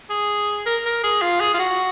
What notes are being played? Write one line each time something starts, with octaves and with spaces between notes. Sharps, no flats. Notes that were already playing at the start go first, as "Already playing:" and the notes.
G#4
A#4
A#4
G#4
F4
G#4
F4
F#4